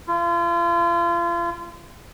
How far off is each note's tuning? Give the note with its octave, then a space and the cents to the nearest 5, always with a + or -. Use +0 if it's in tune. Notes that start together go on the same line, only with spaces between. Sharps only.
F4 -35